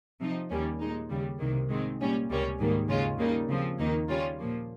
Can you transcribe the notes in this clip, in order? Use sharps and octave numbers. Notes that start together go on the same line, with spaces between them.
C3 F3 C4 D#4
D#2 D#3 G3 A#3 C#4
A#2 G#3 D#4
D#2 C#3 G3
C2 C3 D#3 A#3
G#2 D#3 G#3 C4
A#2 G3 C#4
C#2 C3 G3 A#3 C#4
G#2 D#3 G3 A#3
D#2 C#3 G#3 C#4 F4
C#3 G3 A#3 D#4
C#3 F3 C4
D#2 D#3 A#3 D#4
C#3 G3 C#4 F4
A#2 F3 A#3